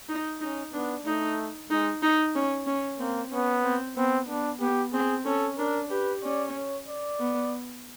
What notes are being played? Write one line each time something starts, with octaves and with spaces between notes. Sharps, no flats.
D#4
C#4 D#4
B3 D4
A3 D#4
G#3 D#4
D#4
C#4
C#4
A#3 C4
B3 C#4
C4
B3 C4
B3 D4
B3 G4
C4 G#4
C#4 A4
D4 A#4
G4 B4
C#4 D5
C#5
D5
B3